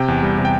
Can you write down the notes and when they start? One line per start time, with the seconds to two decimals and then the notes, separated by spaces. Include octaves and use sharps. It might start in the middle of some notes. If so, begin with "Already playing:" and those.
Already playing: C3 G5
0.08 E2
0.23 G3
0.38 C3
0.45 G5